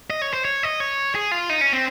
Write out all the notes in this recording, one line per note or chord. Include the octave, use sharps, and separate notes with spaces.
D#5
C#5
C5
C#5
D#5
C#5
G#4
F4
D#4
C#4
C4